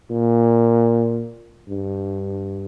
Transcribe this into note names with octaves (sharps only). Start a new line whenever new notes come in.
A#2
G2